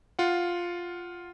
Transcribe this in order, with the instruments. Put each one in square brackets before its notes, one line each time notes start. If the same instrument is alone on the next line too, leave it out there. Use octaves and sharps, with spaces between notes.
[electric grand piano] F4 F#5